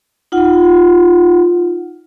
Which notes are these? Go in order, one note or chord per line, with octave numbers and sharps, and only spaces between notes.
D#4 F4 F#5